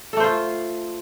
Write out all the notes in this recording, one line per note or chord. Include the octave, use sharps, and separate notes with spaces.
A3 F4 A4 C5